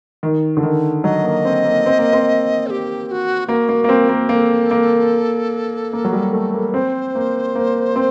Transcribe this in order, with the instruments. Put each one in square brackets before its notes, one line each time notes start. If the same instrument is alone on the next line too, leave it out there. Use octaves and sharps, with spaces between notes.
[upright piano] D#3
D3
D#3
[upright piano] F#3 [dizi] D#5
[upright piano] A#3
C4
A#3
C4
A#3
C4
[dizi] A4
G4
G4
F#4
[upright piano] A#3 [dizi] F#4
[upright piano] A#3
A#3
C4
A#3
[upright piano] A#3 [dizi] C5
[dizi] A4
[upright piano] A#3
A#3
F#3
G3
A3
A#3
[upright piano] C4 [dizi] C5
[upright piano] A#3
A#3
C4